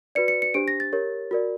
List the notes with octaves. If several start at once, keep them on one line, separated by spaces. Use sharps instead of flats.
F#4 B4 D5 C#7
C#7
C#7
D4 G4 C5 D7
A#6
A6
G4 A#4 C#5
F#4 A#4 D5